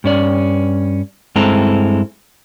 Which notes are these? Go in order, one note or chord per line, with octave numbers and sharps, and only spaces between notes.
G2 C#4 D5
G2 G#3 C4 E4 A4 A#5